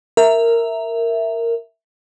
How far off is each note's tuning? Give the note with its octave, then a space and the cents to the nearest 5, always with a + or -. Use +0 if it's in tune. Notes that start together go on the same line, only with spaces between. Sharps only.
A#4 -10 E5 +0